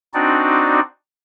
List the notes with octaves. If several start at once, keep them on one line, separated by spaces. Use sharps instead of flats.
C4 D4 D#4 F#4 D5